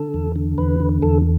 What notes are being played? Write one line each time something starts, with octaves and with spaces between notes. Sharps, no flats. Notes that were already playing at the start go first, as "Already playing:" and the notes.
Already playing: D3 A4
E2
D3
E2 B4
D3
E2 A4